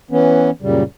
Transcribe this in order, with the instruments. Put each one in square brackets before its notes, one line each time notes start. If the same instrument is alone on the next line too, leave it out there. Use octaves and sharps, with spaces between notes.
[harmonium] E3 B3 C#4
F#2 A#2 C#3 G3